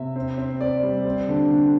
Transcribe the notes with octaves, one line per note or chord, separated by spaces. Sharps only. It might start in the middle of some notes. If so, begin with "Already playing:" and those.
Already playing: C3 E5
C4
C4
C4 D5
G3
C4
D3
D3